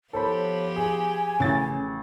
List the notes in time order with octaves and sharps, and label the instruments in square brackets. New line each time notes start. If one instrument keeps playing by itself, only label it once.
[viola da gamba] F3 B3 G4 [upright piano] A4 C5 B5 [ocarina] C#5
[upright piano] G#4 [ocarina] G#5
[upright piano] A1 A6 [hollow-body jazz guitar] C#3